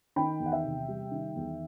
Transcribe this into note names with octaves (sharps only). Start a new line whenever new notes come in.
D#3 G5 B5
E2
F#5
E5 G5
C3
G3
D#3
E2